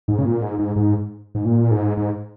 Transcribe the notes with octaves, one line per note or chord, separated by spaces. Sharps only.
G#2
C#3
A#2
G#2
G#2
G#2
G#2
A#2
G#2
G#2